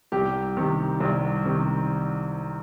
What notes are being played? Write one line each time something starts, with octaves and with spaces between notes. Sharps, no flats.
C2 G4
C3 D#3
C2
C3 D#3